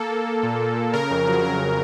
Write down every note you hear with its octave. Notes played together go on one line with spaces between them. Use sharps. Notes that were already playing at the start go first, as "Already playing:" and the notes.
Already playing: A#3 A4
A#3
A#3
A#2
A#2
A#2
C#3 A#4
F2
F#3
F2 A#4
F#3